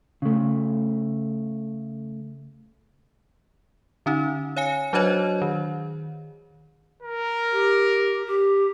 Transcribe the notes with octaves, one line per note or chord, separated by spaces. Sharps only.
C#3 A3
D3 C#4 D#4
C#5 F5 G#5 C#7
F#3 D4 F#4 C5 C#5 D#5
D#3
A#4
G4
G4